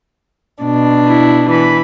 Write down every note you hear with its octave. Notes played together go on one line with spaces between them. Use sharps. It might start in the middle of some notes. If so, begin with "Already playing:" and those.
B2 D4
E4
E3 B5